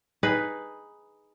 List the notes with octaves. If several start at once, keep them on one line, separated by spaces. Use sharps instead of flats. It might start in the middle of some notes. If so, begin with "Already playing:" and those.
D#4 G#4 B4